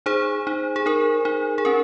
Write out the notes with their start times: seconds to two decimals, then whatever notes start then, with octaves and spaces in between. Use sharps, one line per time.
0.06 D#4 G#4 C5
0.47 D#4
0.76 G#4
0.86 D#4 A#4
1.25 D#4
1.58 G#4
1.65 C#4 A#4